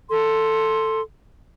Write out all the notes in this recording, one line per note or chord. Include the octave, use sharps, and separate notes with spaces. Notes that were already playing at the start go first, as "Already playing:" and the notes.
A4 C6